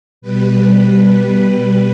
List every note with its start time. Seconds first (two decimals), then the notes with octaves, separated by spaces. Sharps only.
0.22 B2 G3 B4
0.61 B4